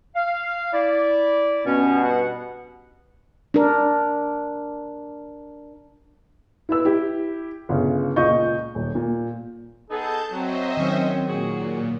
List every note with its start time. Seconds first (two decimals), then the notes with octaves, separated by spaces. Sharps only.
0.15 F5
0.73 E4 D5
1.66 G2 B2 C#4
2.04 F#5
3.54 D4 A#4
6.69 E4 B4 E6
6.85 E4 G4
7.69 G1 C#3
8.16 C#2 A#2 D#5 C#6 G6
8.75 D#1
8.95 A#2
9.90 B3 D#4 G#4 A4 A5 G6
10.31 F#3 C4 C5 D#5 E5
10.77 D#3 F#3 C#4
11.28 A#2 F#4 G#4